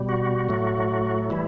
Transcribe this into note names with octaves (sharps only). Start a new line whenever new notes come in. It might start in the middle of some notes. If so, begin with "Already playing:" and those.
Already playing: B2 G3
F#4
A2 F#3 A3
E3 G3 E4